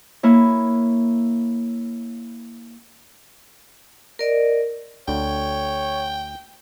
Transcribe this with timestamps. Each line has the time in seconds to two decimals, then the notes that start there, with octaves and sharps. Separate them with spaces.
0.23 A#3 E4 C#5
4.19 A#4 D5 D#5
5.08 D2 D3 C#5 G5